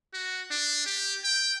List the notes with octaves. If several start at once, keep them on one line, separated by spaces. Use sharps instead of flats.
F#4
D4
G4
G5